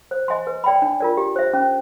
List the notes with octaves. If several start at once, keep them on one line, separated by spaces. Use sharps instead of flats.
C5
D#5 G#5 C6
B4
D5 G5 B5
D4
F4 A#4 D5
G4
C5 E5
C#4